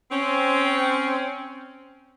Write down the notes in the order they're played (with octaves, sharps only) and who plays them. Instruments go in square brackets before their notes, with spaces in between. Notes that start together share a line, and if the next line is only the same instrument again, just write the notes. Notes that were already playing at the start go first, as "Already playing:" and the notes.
[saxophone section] C4 C#4